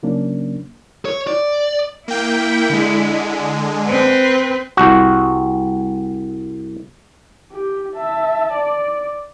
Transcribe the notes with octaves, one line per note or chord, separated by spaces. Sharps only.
C#3 F#3 A#3 C#4 D4
C#5
D5
A#3 E4 G5
D3 G#3
C4 B4
C2 F#4
G4
E5 A5
D5